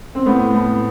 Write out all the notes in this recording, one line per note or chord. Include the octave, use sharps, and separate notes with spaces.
C4
A2 B3
A2